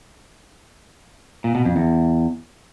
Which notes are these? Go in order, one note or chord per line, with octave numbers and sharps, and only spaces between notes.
A#2
B2
F2
E2